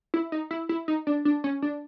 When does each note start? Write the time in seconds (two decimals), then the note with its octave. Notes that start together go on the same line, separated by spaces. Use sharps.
0.14 E4
0.32 D#4
0.51 E4
0.69 E4
0.88 D#4
1.07 D4
1.25 D4
1.44 C#4
1.62 D4